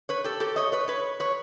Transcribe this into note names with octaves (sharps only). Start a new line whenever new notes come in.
B4 C#5
G4 A4
G4 A4
C#5 D#5
B4 C#5
B4 C#5
B4 C#5